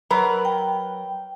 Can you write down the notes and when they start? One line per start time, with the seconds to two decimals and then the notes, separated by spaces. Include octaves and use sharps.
0.10 F#3 A#4 B4
0.45 G5